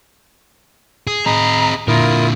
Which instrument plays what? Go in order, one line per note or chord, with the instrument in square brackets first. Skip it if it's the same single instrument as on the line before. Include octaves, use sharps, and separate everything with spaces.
[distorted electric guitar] G#4
[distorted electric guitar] C4 G#4 [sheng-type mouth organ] D#5 B5 [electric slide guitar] A#5
[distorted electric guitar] A#2 D3 [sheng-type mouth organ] E4 F4 D#6 [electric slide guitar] A#4